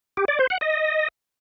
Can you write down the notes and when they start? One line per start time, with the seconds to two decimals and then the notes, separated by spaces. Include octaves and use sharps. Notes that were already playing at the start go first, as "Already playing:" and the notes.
0.17 G4
0.28 D5
0.39 C5
0.50 F#5
0.61 D#5